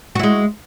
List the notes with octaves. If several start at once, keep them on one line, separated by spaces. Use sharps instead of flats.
G#3 E4 F#4